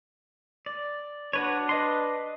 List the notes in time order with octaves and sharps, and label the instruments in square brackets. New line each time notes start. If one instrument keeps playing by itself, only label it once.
[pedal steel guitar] D5
[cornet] D4 [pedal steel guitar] F#4 B4 C#5
[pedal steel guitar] B4 D#5 C6